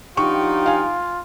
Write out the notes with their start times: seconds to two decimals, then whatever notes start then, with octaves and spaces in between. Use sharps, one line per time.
0.17 F3 D4 D#4 F4 G4 F#5 G5 C#6
0.66 F5 G#5